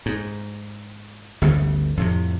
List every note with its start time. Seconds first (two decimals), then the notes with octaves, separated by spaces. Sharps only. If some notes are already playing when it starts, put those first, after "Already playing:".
0.06 G#2
1.42 G1 D2 C#3
1.97 F2 A2 C3